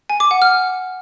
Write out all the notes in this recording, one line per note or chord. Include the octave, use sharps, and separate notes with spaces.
G#5
D6
F#5
F6